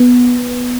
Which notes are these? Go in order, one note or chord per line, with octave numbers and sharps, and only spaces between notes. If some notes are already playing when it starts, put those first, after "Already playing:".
Already playing: B3